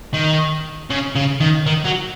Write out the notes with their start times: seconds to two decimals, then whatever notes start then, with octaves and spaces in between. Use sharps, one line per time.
0.14 D#3
0.90 C#3
1.15 C#3
1.40 D#3
1.66 D#3
1.85 F#3